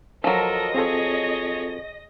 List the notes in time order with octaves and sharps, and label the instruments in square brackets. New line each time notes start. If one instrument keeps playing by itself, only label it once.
[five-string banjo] F3 F#3 [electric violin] A4 A#4 [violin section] D#5 A#6
[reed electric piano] C4 F4 A4 [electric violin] G#4 C#5